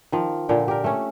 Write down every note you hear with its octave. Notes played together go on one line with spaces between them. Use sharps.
D#3 F3
A#2 D3 G5
G4 A#4
A3 C#4